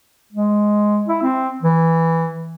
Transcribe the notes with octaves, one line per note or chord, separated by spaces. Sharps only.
G#3
E4
C4
E3